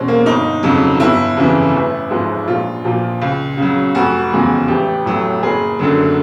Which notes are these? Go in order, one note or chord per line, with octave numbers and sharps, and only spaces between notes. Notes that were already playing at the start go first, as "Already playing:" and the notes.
Already playing: E2 B2 G#3 C4 C#4
A#3
G1 D#4
F2 C#3 F#3
G1 E4
F2 C#3 E3
A1
G#2 F3 G#3
A#1 F4
A#2 F3
C#2
C#3 F#3
F1 F#4
E2 C#3 F3 G#3
A1 G4
A2 F#3
F#1 G#4
F#2 D3 F#3